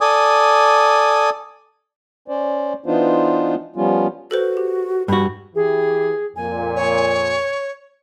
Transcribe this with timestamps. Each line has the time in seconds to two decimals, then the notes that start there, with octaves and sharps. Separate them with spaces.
0.01 A4 D5 G#5 D#6
2.28 C#4 C5 D5
2.86 E3 B3 D4 D#4 F4 C5
3.76 F3 G3 B3 C#4 F4
4.31 F#4 A4 B4 C5
4.57 G4
5.08 G2 F#4 B5
5.55 E3 G4 G#4
6.36 F2 A#2 G#5
6.76 C#5